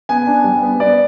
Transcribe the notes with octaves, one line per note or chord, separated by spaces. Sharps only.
B3 G#5
D4
G3
B3
B3 D5